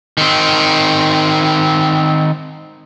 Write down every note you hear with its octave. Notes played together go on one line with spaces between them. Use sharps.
D#3 C4